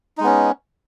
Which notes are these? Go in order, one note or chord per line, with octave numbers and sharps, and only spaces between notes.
G#3 B3 C#4 D#4